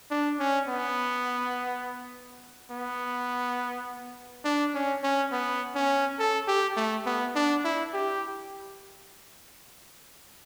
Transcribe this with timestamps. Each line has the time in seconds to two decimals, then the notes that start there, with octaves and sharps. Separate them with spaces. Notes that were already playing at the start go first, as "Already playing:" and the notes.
0.10 D4
0.39 C#4
0.68 B3
2.71 B3
4.44 D4
4.74 C#4
5.03 C#4
5.32 B3
5.75 C#4
6.19 A4
6.47 G4
6.77 A3
7.06 B3
7.35 D4
7.64 E4
7.93 G4